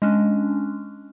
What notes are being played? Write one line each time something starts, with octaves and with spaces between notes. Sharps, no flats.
G#3 C#4 D4